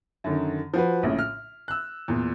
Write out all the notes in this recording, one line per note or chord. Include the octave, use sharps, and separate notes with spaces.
F#2 D3 D#3
F3 F#4 B4
A#1 A2 C#3
F6
E6 F#6
E2 A#2